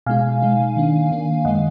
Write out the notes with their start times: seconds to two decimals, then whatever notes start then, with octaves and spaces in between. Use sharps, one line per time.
0.06 B2 G#3 D#4 F5 G#5
0.42 B2 G#3 D#4
0.76 D#3 A#3 D4
1.11 D#3 A#3 D4
1.45 F#2 D#3 G#3 D#5 F#5